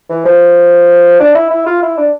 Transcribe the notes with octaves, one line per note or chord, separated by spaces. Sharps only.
E3
F3
D4
E4
E4
F4
E4
D4